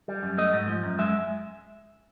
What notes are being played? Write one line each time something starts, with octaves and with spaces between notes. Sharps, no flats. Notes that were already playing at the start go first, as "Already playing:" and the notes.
G3
F#2
A3 D#5
G#2
F3
F#2
G#3 E5